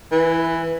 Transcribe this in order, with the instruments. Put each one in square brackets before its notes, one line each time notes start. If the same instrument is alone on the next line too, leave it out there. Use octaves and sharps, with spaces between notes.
[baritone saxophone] E3